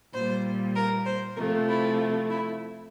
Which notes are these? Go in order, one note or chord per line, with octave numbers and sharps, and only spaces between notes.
A#2 G3 C5
A#4
C5
C3 F3 A3 A#4
E4
E4